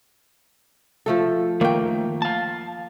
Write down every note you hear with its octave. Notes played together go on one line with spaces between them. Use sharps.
F3 A3 A4
D#3 A3 A#3 G5
F5 A5